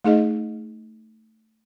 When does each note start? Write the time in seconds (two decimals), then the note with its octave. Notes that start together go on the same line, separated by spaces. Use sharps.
0.05 A3 D#4 G#4 D#5